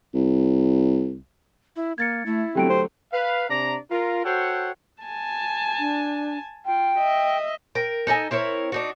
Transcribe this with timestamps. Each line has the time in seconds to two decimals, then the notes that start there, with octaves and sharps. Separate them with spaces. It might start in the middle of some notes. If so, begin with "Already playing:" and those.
0.14 C2
1.76 E4
1.98 A#3 G#6 A6 C#7
2.26 A3 E4
2.55 D3 F#3 A3 C4 G4 G5 D7
2.69 C5
3.12 B4 F5
3.50 C3 D4 D5 A#5
3.91 F4 A#4
4.25 F#4 A4 C5 C#5 F#5 G5
5.03 G#5 A5
5.79 D4
6.66 F4 G5
6.98 D#5 E5
7.75 A#4 G5
8.07 D#4 A4 D#5 G#5
8.31 C4 E4 A#4 C#5
8.72 D4 D#4 F#4